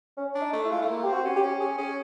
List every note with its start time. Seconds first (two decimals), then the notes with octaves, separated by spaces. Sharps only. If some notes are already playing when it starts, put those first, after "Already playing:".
0.17 C#4
0.35 D4
0.42 D#4
0.53 A3
0.65 E4
0.71 G#3 F4
0.80 A3 E4
0.88 A#3
1.03 C4 G4
1.13 F#4
1.24 C#4
1.36 G4
1.42 C#4
1.60 C#4 G#4
1.78 C#4 G#4